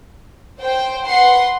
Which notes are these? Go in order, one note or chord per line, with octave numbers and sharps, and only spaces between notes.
C5 G5
B4 F#5 C6